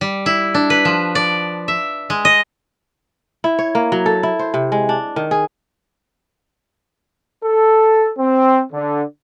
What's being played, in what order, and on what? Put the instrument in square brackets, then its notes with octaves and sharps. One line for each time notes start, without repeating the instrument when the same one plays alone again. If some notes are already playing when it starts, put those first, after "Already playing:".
[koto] G3
E4
D4
B4
F3
D5
E5
G#3
D#5
[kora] E4
C#5
A#3
F#3
A4
E4
C5
C3
G#3
D4
D#3
G#4
[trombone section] A4
C4
D3